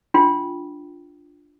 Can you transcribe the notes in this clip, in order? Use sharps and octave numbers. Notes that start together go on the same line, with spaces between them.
D4 F4 G5 C6